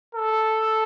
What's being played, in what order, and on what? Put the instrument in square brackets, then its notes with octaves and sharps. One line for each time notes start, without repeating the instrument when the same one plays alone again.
[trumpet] A4